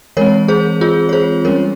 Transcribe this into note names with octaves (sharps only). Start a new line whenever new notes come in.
E3 G#3 C4 A#4 C#5
G#4 C5
F4 G#4
C#5
G#4 C5
G3 C#4 A#4 C#5